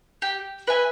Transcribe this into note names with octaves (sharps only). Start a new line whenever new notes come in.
G4
B4 E5 G#5